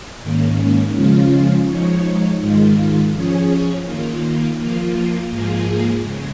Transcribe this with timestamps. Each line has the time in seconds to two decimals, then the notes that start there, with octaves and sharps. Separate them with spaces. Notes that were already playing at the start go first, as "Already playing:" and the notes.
0.22 G#2 D#3 A#3 C#4
0.95 C#3 F3 G#3 C#4 F4
1.68 F3 G#3 D#4 C#5
2.40 G#2 D#3 G#3 F4
3.12 F3 C#4 G#4 C#5
3.85 D#3 A#3 F4
4.57 F3 A#3 F4
5.29 G#2 F3 A#3 F4 G#4
6.02 C#3 G#3